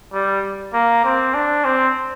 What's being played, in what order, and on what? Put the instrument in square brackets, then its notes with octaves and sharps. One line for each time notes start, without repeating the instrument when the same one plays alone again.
[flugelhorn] G3
A#3
C4
D4
C4